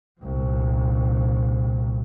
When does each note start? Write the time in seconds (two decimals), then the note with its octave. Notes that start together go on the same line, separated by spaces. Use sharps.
0.21 C2 A#2